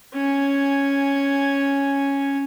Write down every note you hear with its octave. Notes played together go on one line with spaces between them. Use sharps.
C#4 G#5